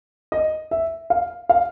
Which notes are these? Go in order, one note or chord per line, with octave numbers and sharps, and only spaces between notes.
D#5
E5
F5
F5